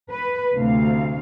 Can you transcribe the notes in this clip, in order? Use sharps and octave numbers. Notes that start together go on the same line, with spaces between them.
B4
D2 C3 F5